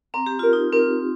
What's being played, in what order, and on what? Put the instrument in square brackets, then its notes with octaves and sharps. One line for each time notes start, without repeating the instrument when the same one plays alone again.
[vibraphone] C4 [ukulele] A#5
[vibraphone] G4
[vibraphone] F4 [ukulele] A#4
[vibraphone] D#4
[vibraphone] C4 [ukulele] A#4